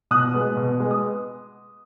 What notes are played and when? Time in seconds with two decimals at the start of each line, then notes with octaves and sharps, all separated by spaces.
0.11 B2 D#6 F#6
0.34 G#3 B3
0.57 B2
0.80 G#3 B3
0.91 D#6